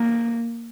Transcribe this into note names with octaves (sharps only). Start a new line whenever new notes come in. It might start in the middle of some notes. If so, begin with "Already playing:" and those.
Already playing: A#3